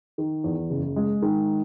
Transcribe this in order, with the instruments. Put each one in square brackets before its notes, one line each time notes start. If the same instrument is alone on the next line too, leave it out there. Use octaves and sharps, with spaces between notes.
[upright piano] D#3
E2
F#1
G#3
D#3